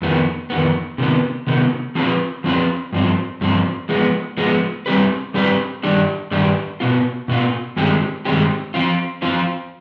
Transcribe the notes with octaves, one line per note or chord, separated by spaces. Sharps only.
F2 D#3 B3
F2 D#3 B3
C3 D#3 B3
C3 D#3 B3
F3 C4 F4 B4
F3 C4 F4 B4
G2 F3 C4
G2 F3 C4
F3 G#3 B3
F3 G#3 B3
G3 C4 G4 B4
G3 C4 G4 B4
G2 D#3 G3 D4 G4
G2 D#3 G3 D4 G4
B2 B3 F4
B2 B3 F4
G2 D#3 G#3 C4 G4
G2 D#3 G#3 C4 G4
F3 C4 F4
F3 C4 F4